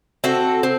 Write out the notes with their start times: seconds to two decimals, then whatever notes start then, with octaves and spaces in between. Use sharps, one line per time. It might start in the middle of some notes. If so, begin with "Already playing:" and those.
0.24 C4 F#4 A4
0.63 C4